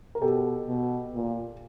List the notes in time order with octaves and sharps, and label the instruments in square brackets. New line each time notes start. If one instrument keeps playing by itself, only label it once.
[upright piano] A#4
[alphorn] B2 [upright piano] G4 A4
[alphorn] B2
A#2